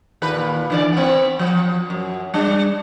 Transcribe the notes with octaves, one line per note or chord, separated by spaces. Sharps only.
D#2 A#2 B4
D3 E3 D5
B3 C4
F3
F#2
G3 D4